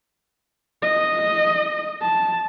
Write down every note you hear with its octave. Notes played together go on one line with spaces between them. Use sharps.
D#5
A5